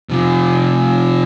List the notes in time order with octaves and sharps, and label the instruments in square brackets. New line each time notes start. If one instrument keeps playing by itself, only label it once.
[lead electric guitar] C3 F3